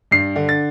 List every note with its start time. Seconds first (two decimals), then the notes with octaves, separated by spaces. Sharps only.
0.11 G2 C7
0.36 D3
0.49 A6